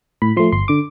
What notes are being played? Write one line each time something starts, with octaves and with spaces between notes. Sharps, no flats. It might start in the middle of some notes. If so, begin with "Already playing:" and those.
A2 B5
F3 A3 C6
G1 C6
D3 D6